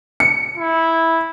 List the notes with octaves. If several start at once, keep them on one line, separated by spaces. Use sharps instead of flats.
C#7
E4